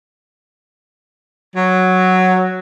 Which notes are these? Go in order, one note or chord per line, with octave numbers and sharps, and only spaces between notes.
F#3